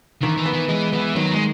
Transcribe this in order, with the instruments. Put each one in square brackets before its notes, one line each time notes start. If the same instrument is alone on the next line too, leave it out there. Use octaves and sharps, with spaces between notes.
[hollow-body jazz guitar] D#3 [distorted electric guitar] E3
[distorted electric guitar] E3
[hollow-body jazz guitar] B3
[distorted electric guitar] E3
[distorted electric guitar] E3 [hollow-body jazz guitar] G#3
[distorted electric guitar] E3 [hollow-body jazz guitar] B3
[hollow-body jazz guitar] D#3 [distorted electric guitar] F#3
[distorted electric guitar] G#3